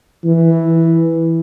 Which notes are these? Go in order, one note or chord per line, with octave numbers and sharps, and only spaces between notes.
E3